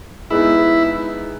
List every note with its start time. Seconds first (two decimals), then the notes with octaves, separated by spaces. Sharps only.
0.30 G#3 B3 D#4 E4